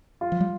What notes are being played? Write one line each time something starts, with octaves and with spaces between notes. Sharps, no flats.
F4
F3
G3